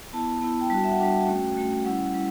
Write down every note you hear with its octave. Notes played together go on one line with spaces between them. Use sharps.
B3 E4 A5
B3 E4
G5
G3 D4 F#4 A5
E5
F#5
G3 D4 F#4 G5
A3 C#4 F#4
A3 C#4 F#4
G3 C#4 E4 F#5
G3 C#4 E4